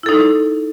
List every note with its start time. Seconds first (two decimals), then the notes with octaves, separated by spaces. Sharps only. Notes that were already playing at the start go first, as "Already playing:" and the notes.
0.03 E4
0.06 A4
0.09 D#4